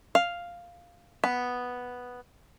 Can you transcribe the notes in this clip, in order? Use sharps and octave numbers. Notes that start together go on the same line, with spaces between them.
F5
B3